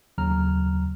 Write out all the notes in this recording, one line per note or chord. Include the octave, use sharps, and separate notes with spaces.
D#2 C#3 F#3 A#5 F6